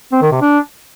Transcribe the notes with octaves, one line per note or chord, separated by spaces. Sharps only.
C4
D#3
C3
D4